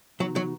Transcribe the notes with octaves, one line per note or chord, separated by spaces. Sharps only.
C3 E3 F#3 B3 D#4 F#4
F#3